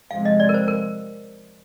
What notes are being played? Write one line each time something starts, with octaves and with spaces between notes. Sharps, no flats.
C3 F3 G#3 C4 F5
D#5
D5
A#4
C5
A#4